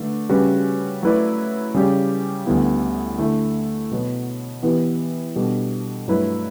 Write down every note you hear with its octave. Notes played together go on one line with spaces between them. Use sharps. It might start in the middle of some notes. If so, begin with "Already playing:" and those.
Already playing: D3 A3 D4 B4
C#3 G3 C#4 F#4 B4
F#3 A3 E4 B4 D5
C#3 G3 C#4 G4 D5
D2 D3 G3 B3 E4
D3 A3 E4 A4
B2 F#3 B3
E3 B3 E4 G4 B4
B2 G3 D4 A4
G2 F#3 A3 E4 B4